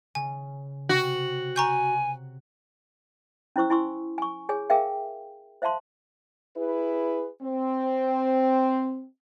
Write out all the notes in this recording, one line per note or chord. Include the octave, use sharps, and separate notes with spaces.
C#3 G#5
C3 F#4
G#5 A#5 C#6 G6
C#4 E4 C5 C#6 E6
E4 G#5 C6 C#6 E6
G#5 C#6
G#4 C#5 G#5
G#4 A#4 E5 F5 G5
C5 E5 F5 A5 C6
E4 G#4 B4
C4